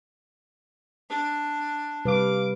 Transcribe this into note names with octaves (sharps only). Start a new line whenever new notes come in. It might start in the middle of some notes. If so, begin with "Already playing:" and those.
D4
C3 G3 B4 F5 D6